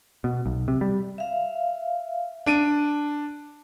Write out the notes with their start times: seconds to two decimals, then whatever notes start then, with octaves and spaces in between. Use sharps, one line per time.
0.24 B2
0.46 B1
0.68 C3
0.81 G3
1.18 E5 F5
2.46 D4 D7 D#7